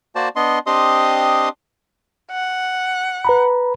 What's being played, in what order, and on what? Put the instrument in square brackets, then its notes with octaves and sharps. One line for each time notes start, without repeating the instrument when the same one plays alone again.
[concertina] A#3 F#4 C5 D5 A5
B3 D4 D#5 C6
C4 D4 G4 D#5 C6 D#6
[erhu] F#5
[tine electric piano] B4 A#5 B5